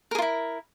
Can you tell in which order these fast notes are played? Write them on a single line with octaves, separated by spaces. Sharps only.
A#4 G#4 F4 E4